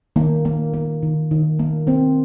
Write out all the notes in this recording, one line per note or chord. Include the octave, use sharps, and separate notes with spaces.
D#3 A#3
A#3
A#3
D#3
D#3
A#3
A#3 C4